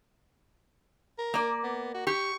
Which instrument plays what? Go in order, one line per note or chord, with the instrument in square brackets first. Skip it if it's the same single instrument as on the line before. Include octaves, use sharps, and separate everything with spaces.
[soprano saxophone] A#4
[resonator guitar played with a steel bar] A#3 D5
[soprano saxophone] B3
F#4
[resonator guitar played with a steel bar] G4 [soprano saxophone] C#6